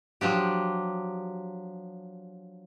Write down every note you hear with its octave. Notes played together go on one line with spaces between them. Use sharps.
F3 F#3 D4 G4